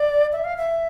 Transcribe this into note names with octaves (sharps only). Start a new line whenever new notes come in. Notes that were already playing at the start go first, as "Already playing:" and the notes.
Already playing: D5
E5
F5
E5